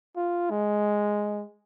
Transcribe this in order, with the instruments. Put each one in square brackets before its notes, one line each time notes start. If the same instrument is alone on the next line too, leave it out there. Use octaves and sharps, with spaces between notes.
[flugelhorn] F4
G#3